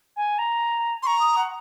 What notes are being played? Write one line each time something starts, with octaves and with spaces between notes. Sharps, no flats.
G#5
A#5
A#5 C6 C#6
D#6
F#5